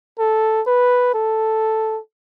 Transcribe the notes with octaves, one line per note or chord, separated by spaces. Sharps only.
A4
B4
A4